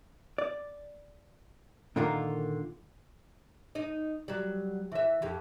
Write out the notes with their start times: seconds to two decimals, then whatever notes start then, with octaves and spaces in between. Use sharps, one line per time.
0.38 D5
1.96 A#2 D3 D#3 A#3 F4 A#4
3.75 D#4 D#5
4.28 F#3 G3
4.92 E3 E5
5.22 F2 G4